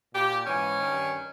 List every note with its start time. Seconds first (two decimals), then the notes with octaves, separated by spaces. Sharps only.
0.14 A#2 G4
0.47 G#2 E3 C#4
0.79 D#3
0.84 G2